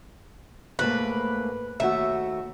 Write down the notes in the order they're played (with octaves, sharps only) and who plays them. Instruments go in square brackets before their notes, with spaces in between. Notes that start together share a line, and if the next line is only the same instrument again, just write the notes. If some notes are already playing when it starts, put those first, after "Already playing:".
[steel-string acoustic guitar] G#2 A3 A#3 [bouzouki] B4
[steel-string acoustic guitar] D#2 A3 F#4 [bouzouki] E5